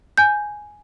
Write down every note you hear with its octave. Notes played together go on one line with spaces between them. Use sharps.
G#5 G6